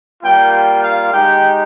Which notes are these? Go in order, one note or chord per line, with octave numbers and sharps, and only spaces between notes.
G3 A#3 F4 G5
G5
F5
G#3 D#4 G4 G5